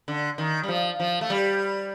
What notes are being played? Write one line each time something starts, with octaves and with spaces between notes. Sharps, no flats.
D3
D#3
G3
F3
F3
A3
G3